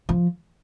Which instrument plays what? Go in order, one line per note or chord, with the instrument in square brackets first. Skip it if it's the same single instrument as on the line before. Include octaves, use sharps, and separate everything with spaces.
[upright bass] F3